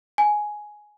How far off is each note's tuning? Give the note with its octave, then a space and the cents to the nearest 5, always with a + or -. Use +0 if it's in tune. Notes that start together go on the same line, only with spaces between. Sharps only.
G#5 +10